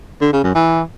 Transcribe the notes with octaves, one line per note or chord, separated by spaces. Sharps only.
D3
C#3
F#2
E3